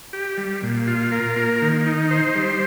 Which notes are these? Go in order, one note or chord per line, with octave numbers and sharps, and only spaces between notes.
G4
G3
A#2
F4
A#4
A#3
D#3
D#4
C5
G3